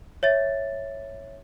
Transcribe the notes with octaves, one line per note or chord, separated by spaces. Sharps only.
C#5 E5 A6